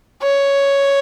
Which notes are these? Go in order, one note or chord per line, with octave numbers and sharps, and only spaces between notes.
C#5